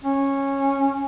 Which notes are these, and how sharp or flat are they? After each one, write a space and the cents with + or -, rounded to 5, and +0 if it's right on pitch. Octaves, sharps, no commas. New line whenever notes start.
C#4 -10